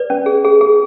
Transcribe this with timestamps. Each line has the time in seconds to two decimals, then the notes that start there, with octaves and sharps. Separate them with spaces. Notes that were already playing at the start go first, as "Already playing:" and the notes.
Already playing: B4 D5
0.10 C#4
0.26 G#4
0.45 G#4
0.61 G#4